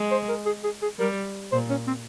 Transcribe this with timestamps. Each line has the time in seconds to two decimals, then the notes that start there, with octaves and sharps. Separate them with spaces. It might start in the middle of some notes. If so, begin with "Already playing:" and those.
Already playing: G#3
0.11 C5
0.29 A#4
0.46 G#4
0.64 G#4
0.82 G#4
0.99 G3 A#4
1.52 A#2 C5
1.70 C#4
1.87 C4